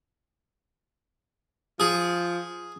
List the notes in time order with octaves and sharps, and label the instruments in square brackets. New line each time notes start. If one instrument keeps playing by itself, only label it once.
[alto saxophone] F3 [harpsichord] G#4